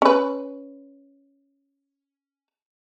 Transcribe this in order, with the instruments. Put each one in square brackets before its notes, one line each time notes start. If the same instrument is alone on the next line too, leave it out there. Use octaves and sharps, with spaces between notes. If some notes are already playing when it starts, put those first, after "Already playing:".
[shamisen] C#4 B4